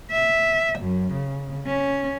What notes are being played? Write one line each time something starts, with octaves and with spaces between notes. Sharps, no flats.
E5
F#2
C#3
C#4